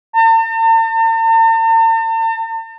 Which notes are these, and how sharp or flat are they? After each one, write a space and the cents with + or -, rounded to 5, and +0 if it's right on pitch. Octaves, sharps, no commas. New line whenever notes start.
A5 +45